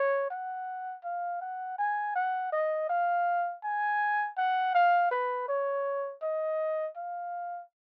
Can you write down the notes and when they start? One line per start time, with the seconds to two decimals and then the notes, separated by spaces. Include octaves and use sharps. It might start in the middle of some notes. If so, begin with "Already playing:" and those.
Already playing: C#5
0.30 F#5
1.04 F5
1.41 F#5
1.78 G#5
2.15 F#5
2.52 D#5
2.89 F5
3.63 G#5
4.38 F#5
4.75 F5
5.11 B4
5.48 C#5
6.22 D#5
6.96 F5